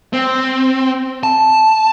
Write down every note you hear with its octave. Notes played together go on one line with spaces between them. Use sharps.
C4
A5